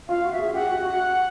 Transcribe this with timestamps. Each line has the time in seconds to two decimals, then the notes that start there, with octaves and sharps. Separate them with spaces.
0.09 F4 F5
0.24 F#4
0.32 E5
0.39 G#4
0.54 G4 F#5
0.70 F#4
0.84 F#4